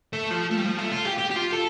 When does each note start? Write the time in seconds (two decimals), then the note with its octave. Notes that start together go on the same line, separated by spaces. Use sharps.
0.13 A3
0.31 F3
0.51 A3
0.58 G3
0.66 F3
0.78 A3
0.91 F4
1.05 G4
1.18 G4
1.31 G4
1.35 F4
1.53 A4